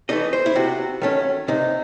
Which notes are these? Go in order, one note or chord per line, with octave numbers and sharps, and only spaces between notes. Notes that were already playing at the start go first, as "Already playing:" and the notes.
E3 A3 D#4 D#5
C5
E4
C3 F#4
D#3 A3 C#4
C3 D#4